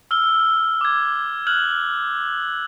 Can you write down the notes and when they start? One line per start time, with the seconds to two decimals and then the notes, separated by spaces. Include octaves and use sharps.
0.11 E6 F6 G7
0.81 D6 G#6
1.47 F6 F#6 G#6 F#7